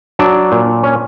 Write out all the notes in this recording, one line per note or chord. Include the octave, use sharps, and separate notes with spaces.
F#3 D4
A#2
C#4